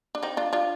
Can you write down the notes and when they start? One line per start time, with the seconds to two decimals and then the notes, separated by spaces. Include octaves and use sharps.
0.15 D4
0.23 C4 D#4
0.37 D4 F4
0.53 D4 F4